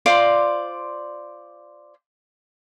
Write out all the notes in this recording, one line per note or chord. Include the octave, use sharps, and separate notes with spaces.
F4 C5 D5 D6